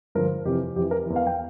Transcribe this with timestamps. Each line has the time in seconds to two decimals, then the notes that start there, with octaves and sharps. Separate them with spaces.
0.15 G2 D3 F3 A#4
0.45 F2 C3 E3 G4
0.76 F2 E3 G4
0.91 A#4
1.06 E2 E3
1.16 F5
1.26 G5